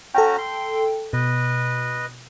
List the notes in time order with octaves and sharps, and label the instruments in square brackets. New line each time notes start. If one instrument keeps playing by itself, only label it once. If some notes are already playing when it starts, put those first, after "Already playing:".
[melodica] C#4 F#4 A#5 [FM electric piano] A4 G5
[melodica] C6
[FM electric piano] B2 [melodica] B4 D#5